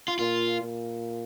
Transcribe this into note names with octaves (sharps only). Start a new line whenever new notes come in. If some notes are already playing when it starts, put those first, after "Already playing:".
F4
A#2 F4
A#2